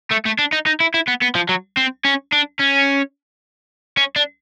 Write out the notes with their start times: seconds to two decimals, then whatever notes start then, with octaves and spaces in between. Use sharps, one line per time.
0.11 A3
0.26 A3
0.39 D4
0.52 D#4
0.66 D#4
0.80 E4
0.94 E4
1.08 B3
1.22 B3
1.35 F3
1.49 F#3
1.77 C4
2.04 C#4
2.32 D4
2.60 C#4
3.97 C#4
4.16 D4